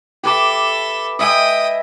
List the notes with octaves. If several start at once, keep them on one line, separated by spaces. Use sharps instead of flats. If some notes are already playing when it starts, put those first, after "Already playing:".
G4 A4 B4 E5 D6
D#5 E5 G5 G#5 D#6